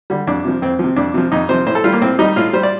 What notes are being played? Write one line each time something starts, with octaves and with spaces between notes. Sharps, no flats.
D3 G3
F2 D4
C3 F3
F2 C4
C3 F3
F2 D4
C3 F3
F2 D#4
C3 F3 C5
A2 C5
A4
G3 F4
A#3
A2 C4
G3 D#4
A2 F4
G3 C5
D5